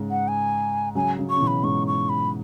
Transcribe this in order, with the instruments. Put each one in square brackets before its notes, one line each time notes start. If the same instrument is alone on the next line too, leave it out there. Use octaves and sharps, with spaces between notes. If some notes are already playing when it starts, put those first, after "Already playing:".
Already playing: [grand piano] G#2 C#3
[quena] F#5
G#5
[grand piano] C#3 F#3 [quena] G#5
[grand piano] C#3 F#3
[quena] C#6
[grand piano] C#3
B2 E3
[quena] B5
[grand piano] G#2 C#3 [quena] C#6
[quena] C#6
B5